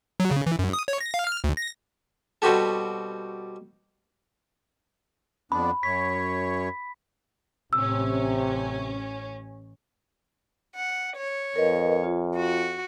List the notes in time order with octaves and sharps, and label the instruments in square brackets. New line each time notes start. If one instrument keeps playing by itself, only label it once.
[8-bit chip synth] F#3
C#3
E3
F#2
D#6
C#5
A#6
F5
F6
D2
A#6
[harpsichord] B2 G3 C4 F#4 G4 A4
[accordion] F2 B3 D4 [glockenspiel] B5
[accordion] F#2 C#5 [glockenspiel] B6
[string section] A1 C#4 [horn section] C3 [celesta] E6
[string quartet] F#5
C#5
[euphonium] F2 [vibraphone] A#4 B4 D#5
[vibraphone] F4
[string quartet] F#4